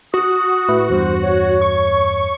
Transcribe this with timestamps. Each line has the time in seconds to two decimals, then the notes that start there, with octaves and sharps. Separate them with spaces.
0.14 F#4 D#6
0.69 A2 E4 B4
0.90 E2 G2 C5
1.22 C#5
1.61 C#6